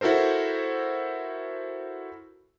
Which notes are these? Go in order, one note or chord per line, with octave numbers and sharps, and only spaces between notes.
E4 F#4 A4 A#4 C5